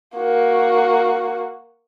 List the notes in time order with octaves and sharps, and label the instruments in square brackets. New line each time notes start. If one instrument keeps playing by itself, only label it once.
[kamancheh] A#3 F#4